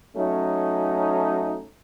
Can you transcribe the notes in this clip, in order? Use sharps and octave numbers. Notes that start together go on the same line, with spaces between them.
F#3 A3 C#4 D#4